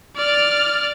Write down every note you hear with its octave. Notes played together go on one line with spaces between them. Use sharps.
D5 F6